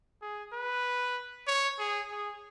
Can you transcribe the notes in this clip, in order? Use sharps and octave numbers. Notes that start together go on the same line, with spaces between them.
G#4
B4
C#5
G#4
G#4